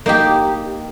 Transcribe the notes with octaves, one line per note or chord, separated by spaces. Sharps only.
A#3 D#4 G4